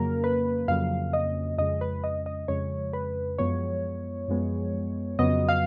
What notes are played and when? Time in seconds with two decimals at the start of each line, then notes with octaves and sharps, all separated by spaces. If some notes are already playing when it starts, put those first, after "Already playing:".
Already playing: F2 C#3 F#3 A#3 A#4
0.24 B4
0.68 F2 C#3 F#3 A#3 F5
1.13 D#5
1.58 F2 C#3 G#3 D#5
1.81 B4
2.04 D#5
2.26 D#5
2.48 F2 C#3 G#3 C#5
2.93 B4
3.38 F#2 F3 G#3 B3 C#5
4.28 F#2 F3 G#3 B3
5.19 F2 C#3 F#3 B3 D#5
5.49 F5